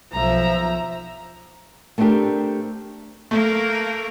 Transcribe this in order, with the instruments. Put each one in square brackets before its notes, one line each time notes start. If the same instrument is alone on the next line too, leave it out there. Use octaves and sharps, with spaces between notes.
[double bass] B1 F3 [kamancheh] E5 A#5
[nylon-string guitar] A3 B3 C4 D4 G4 A#4
[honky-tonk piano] A3 [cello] A#3 A#4